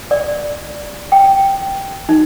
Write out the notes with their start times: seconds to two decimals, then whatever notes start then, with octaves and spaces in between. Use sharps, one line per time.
0.11 D5
1.12 G5
2.09 D#4